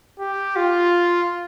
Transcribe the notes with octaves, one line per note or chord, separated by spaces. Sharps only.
G4
F4